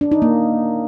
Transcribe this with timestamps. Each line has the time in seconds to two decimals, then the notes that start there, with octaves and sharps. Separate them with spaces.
0.01 D4
0.11 D#4
0.22 A#3